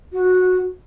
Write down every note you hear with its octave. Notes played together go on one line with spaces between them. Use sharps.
F#4